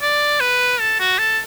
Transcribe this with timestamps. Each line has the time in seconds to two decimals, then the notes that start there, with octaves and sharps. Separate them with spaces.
0.02 D5
0.41 B4
0.80 A4
1.00 F#4
1.19 A4